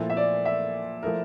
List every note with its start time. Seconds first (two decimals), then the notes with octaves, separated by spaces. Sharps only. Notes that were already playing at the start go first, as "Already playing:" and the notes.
Already playing: A#2 F3 A3 E4
0.10 E5
0.17 D5
0.45 E5
1.03 F3 A3 E4 A#4